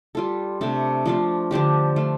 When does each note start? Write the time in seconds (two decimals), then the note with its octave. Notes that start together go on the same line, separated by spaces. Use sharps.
0.15 G3 F4 A4
0.61 C3 A3 D4 A4
1.06 F3 A3 D4 F4
1.51 D3 F3 D4 G4
1.96 A3 D4 F4